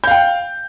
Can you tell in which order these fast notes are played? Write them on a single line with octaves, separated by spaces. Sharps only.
G6 F5 G5